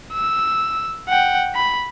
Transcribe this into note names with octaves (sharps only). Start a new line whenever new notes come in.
E6
F#5 G5
B5